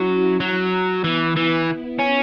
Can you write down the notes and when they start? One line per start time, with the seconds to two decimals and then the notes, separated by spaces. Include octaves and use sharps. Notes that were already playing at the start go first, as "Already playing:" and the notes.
Already playing: F#3 C#4 E4 F#4
0.40 F#3
1.04 E3 B3 E4
1.36 E3
1.99 C#4